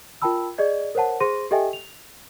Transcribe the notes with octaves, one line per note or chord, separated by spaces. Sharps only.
F4 A#4 G5 A5 B5 E6
G#4 D5 D#5 G#6
A#4 C5 C#5 F#5 A5
G#4 C5 C6 A#6 D#7
G4 A4 D#5 E5 G5 G#5
F7